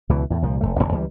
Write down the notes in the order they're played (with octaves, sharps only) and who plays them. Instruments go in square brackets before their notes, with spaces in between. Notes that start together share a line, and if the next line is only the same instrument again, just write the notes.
[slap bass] C#2 B2 E3
E2 A2
C2 A#2 F3
F1 C2 A3
D#1 C2 B2 D3
C#2 E3 G3